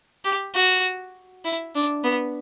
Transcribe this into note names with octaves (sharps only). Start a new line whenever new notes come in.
G4
F#4
E4
D4
B3